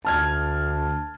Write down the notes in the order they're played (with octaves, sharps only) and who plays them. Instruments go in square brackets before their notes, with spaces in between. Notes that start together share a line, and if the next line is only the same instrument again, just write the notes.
[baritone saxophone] D2 [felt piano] A5 F6 G#6